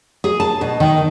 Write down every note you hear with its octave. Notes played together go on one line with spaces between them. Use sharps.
G#4
A5
B2
D#3